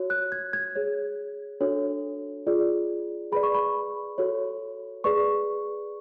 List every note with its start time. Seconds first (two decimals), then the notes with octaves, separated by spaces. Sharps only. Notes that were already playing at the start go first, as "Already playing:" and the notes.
Already playing: F#4 C#5
0.10 F#6
0.32 G#6
0.53 G#6
0.75 G#4 C#5
1.61 D4 F#4 A4 C#5
2.46 F4 G#4 D5
3.32 G#4 B4 D5 B5
3.43 C#6
3.54 B5
4.18 F#4 A4 C#5
5.04 G#4 B4 D5 C#6